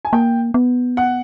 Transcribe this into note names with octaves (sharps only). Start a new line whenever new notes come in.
G#5
A#3 G5
B3
F#5